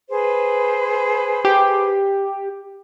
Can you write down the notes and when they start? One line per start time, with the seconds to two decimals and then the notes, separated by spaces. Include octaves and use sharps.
0.10 G#4 B4 C5
1.45 G4